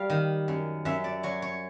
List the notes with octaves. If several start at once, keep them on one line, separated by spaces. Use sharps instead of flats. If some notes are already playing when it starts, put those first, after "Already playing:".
Already playing: G3 F5
D#3
F#2
F#2 E5
D5
F#3 C#5
C#5